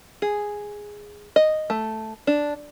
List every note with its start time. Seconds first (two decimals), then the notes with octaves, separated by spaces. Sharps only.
0.22 G#4
1.36 D#5
1.70 A3
2.27 D4